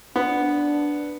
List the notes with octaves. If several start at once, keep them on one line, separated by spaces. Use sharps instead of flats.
B3 D4